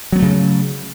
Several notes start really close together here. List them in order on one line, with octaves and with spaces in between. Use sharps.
F#3 B3 A3 C#3